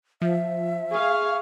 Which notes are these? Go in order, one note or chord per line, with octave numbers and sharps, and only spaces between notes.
F3 E5
G#4 F5 C#6